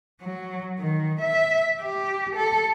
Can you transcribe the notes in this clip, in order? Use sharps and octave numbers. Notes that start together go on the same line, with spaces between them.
F#3
D#3
E5
G4
A4